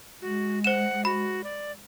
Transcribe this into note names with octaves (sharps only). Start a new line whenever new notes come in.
G#3 F#4
C5 F#5 E7
F#4 B5
D5